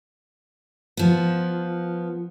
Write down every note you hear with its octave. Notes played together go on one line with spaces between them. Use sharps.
F3 B3